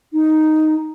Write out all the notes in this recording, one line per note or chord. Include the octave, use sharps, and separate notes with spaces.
D#4